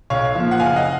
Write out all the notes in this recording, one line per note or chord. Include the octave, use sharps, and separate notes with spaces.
B1 C#5 F5
A#2 F3
F#5
F#1 F5 G#5
D#5 F#5